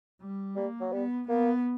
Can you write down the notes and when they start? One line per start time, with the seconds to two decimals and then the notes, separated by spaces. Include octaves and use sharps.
0.21 G3
0.56 G3 A#3
0.81 F#3
0.92 G3 B3
1.28 A#3 B3